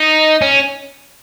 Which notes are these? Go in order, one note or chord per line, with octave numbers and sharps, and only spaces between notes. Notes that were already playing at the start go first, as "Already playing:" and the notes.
Already playing: D#4
C#4